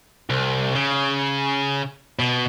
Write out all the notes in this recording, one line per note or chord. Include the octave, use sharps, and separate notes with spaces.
C2
C#3
B2